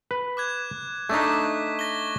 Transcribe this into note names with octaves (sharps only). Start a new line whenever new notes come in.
B4
D6 F#6 G#6
A3 D4 D#4 C#6 D6 B6
A#6 G7